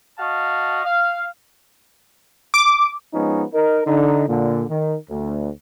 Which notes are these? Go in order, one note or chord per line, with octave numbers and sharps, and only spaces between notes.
F#4 D#5 F5 A5
F5
D6
F3 G#3 B3 C#4 D#4
D#4 A#4
D3 D#4
A#2 D3
D#3
D2